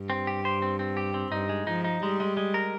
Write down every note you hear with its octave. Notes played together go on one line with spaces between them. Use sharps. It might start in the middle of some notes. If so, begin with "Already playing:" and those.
Already playing: G2
C4
G4
C5
C4
C4
G4
C4
G2 D#4
G#3
F3 D#4
D#4
G3 G#3
G#3
G#3
A#4